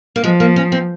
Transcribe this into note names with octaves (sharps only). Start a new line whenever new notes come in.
A#3
F3 G#3
A#3
C#4
C4